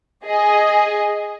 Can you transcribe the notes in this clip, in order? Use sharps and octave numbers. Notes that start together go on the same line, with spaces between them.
G#4 D#5